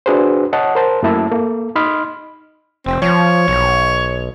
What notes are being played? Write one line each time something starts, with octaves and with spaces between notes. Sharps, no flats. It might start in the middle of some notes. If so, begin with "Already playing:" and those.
D4 F#4 G#4 B4 C5
C#5 D#5 F#5 A5
A#4 C5 A5
F#2 A3 A#3 E4 E5 A5
A#3 A4
D#4 D#5 B5 C6 F6
F1 C4
F3 C#5
B1